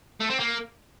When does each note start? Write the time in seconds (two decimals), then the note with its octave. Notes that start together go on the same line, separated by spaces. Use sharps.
0.20 A3
0.30 C4
0.40 A#3